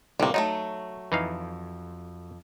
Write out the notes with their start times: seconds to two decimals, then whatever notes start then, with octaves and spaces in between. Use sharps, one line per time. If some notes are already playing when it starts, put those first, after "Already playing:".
0.20 D2 A2 C3 G3 A#3
0.34 F#3 G#3 A3 D#4
1.12 F2 E3 D#4 F5